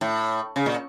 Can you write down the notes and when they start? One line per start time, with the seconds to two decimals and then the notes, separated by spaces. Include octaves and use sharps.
0.01 A2
0.56 C#3
0.66 A#2